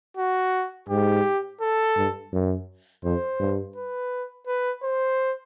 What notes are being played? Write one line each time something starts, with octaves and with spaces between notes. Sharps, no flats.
F#4
G#2 G4
A4
G2
F#2
F2 C5
G2
B4
B4
C5